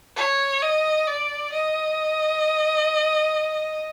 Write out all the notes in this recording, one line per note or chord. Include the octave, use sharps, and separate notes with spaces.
C#5
D#5
D5
D#5